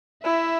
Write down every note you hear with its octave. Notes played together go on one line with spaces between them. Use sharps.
E4 E5